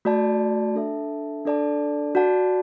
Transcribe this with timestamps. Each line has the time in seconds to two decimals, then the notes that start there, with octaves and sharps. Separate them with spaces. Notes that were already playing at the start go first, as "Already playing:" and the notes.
0.05 A3 F#4 D5 A5
0.75 D4 A4 E5 A5
1.45 D4 A4 D5 A5
2.15 F#4 D5 F#5 A5